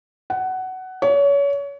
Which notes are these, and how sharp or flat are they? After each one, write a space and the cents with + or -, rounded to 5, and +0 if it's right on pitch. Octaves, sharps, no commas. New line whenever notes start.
F#5 +15
C#5 +30